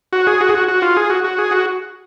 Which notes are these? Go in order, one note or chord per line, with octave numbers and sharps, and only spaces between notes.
F#4
G#4
F#4
G#4
F#4
F#4
F4
G#4
F#4
F#4
G#4
F#4